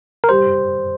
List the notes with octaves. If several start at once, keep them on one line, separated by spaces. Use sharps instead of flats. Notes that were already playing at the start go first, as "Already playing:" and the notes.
A#4
G3 C5